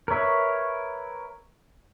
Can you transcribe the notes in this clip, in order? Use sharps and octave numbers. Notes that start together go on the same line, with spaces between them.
A#4 B4 C#5 E5